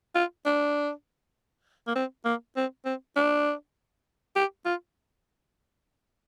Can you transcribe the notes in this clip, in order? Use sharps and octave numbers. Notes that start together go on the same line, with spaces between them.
F4
D4
A#3
C4
A#3
C4
C4
D4
G4
F4